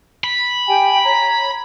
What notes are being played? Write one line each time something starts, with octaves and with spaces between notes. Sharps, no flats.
B5
G4 G5 G#5
C#5 A#5